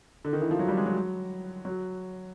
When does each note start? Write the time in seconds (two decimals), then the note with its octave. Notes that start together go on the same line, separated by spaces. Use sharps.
0.25 D3
0.33 D#3
0.42 E3
0.51 F3
0.59 F#3
0.68 G3
0.77 G#3
0.86 F#3
1.65 F#3